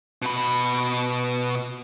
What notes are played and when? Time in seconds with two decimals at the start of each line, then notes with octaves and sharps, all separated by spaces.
0.22 B2 B5